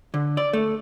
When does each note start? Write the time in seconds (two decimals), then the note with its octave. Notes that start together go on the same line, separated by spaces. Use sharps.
0.14 D3
0.37 D5
0.53 A3